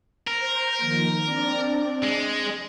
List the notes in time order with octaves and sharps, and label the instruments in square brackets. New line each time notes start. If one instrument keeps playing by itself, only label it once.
[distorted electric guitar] A#4 [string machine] C5 A#5 G6
[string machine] D#3 F3 A#3
C4 D4 D5
[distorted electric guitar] G#3